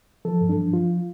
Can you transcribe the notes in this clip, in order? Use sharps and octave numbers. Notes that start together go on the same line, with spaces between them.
F3 A4
G2
D4
F3
F3 F4